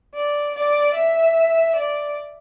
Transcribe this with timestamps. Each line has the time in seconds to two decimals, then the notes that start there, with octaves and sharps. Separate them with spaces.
0.14 D5
0.55 D5
0.95 E5
1.76 D5